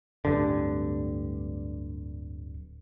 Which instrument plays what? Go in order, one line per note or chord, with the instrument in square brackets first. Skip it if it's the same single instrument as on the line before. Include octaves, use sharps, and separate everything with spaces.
[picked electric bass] D1 G2 D3